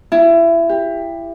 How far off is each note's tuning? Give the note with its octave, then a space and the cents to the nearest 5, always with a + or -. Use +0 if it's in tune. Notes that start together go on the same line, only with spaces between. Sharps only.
E4 +25
G4 +20